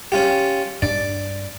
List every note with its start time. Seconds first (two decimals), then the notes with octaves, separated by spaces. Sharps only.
0.12 C#4 F4 G4
0.82 G2 D4 D5